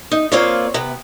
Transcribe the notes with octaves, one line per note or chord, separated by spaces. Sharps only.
D#4
A#3 C4 F4 C#5 D5
C3 B3